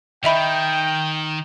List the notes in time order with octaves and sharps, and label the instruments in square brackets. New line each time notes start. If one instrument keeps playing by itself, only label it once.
[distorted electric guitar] D#3 [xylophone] D#5 E5 B5 [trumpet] G5